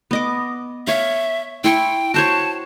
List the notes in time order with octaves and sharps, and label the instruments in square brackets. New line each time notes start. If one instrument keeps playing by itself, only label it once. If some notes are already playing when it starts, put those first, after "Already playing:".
[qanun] B3 D#5 D6
[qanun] C#5 F5 [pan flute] E5
[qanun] E4 C6 C#6 [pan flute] G5
[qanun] F#4 C5 C#5 [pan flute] A5